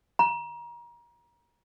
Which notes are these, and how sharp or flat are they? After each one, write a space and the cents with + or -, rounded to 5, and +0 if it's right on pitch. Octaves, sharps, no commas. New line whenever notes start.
A#5 +30